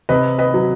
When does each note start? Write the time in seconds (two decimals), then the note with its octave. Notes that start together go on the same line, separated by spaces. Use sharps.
0.09 C3 B4 D#5
0.38 B4 D#5
0.54 F#3